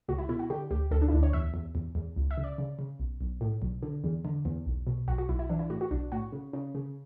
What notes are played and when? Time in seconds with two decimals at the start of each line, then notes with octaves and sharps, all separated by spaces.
0.08 C#2 F#4
0.18 E4
0.29 B2 E4
0.39 F#4
0.50 D3 G4
0.71 D2 G4
0.91 D2 A4
1.02 D4
1.08 E4
1.12 D2 D4
1.23 C#5
1.33 E2 E5
1.54 E2
1.75 E2
1.95 E2
2.16 C#2
2.31 E5
2.37 C#3
2.44 D5
2.58 C#3
2.79 C#3
3.00 B1
3.21 B1
3.41 A2
3.62 B1
3.82 D3
4.04 E2
4.25 D3
4.45 E2
4.66 B1
4.87 B2
5.08 B1 F#4
5.18 F#4
5.29 B1 E4
5.39 E4
5.49 E3 D4
5.59 E4
5.70 A2 F#4
5.81 F#4
5.91 B1 D4
6.12 A2 F#4
6.32 C#3
6.53 C#3
6.75 C#3